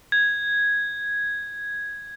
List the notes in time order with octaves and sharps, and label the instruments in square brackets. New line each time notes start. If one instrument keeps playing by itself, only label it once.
[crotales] G#6